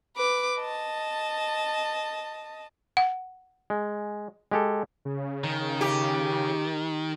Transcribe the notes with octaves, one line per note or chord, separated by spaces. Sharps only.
B4 D6
D#5 A5
F#5
G#3
G#3 G4 A4
C#3
D#3
G4